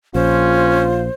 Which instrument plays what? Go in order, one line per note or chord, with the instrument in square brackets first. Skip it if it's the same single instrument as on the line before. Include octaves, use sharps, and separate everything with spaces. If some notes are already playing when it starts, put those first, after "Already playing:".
[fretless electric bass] A#1 [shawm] C#4 [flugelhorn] F4 [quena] C5